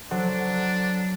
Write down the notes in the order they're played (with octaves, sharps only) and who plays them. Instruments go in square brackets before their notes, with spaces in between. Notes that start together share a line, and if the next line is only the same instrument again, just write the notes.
[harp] F#3 [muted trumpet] D4 [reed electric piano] A4 C5 F#5